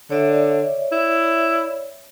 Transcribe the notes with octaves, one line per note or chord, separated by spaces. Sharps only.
D3 C#5 D5 E5
E4